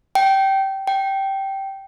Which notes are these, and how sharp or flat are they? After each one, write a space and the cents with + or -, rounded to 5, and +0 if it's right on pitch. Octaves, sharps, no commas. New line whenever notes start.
G5 -15
G5 -10